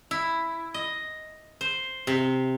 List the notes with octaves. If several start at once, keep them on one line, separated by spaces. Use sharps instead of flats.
E4
D#5
C5
C3